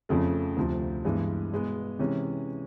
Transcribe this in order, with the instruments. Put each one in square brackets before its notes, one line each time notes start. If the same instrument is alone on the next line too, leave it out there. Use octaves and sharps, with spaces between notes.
[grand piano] F2 C#3 F3 A3
D2 C3 F3
G2 E3 G#3 B3
B2 G#3 B3
C3 E3 G#3 C#4